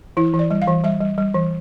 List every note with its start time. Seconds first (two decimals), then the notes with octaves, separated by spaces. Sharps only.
0.17 E3 E4
0.34 E3
0.39 D5
0.51 G3
0.62 F5
0.68 E3
0.84 G3 E5
1.01 G3
1.18 G3
1.34 E3